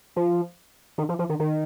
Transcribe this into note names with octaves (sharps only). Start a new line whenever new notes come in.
F3
D#3
F3
F3
D#3
D#3